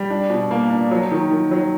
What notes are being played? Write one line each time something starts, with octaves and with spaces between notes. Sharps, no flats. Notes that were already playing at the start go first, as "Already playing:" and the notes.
Already playing: G3
D4
B2
A#3
D4
F#3
D#3
D#3
F#3